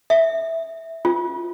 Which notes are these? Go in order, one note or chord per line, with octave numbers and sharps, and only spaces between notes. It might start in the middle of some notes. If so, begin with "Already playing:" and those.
E5
F4